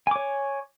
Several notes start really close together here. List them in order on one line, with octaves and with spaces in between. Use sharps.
G#5 D6 C#5